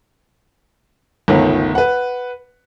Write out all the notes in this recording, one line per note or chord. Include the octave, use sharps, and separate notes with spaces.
G1 C#2 D#3 A3 B3
B4 F#5